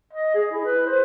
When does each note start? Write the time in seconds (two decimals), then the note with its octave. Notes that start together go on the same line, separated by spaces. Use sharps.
0.13 D#5
0.34 G#4
0.51 E4
0.65 B4
0.86 C5